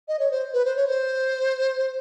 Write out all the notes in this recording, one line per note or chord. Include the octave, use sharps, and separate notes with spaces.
D#5
C#5
C5
B4
C5
C#5
C5